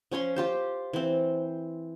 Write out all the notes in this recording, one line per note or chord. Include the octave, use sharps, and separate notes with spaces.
F3 C#4 C#5 C6
F4 G4 C5
E3 C4